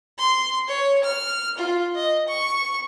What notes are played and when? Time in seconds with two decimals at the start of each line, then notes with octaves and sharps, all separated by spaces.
0.19 C6
0.68 C#5
1.03 F6
1.57 F4
1.95 D#5
2.28 C#6